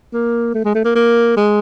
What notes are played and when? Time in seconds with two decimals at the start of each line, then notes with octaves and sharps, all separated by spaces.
0.13 A#3
0.54 A3
0.65 G#3
0.75 A3
0.85 A#3
0.95 A#3
1.36 G#3